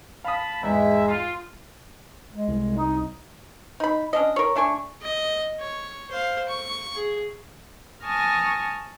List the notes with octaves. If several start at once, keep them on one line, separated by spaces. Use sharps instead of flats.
F5 A5 B5 D#6
E2 G#2 G#3 E5
F4
G#3
C2
D#4
D#4 B5
C#4 D4 D#5
A#4 C#5
A3 D4 G#5 C#6
D#5
C#5
C5 F5
C#6
G#4
G#5 A5 C#6 D#6 F6 A#6